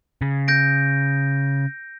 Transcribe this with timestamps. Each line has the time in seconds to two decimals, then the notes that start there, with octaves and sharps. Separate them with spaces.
0.21 C#3
0.48 G6 A#6 D7